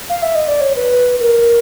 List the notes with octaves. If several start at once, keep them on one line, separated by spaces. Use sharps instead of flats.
F5
E5
D#5
D5
C#5
B4
A#4